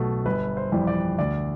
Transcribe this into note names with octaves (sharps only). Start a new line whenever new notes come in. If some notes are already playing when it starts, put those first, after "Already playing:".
Already playing: B1 B2 A3
G1 B4
C5
F2 E3 G3
D5
D2 D5